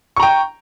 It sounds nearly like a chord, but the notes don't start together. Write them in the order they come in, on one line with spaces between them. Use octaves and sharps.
C#6 A#5 G5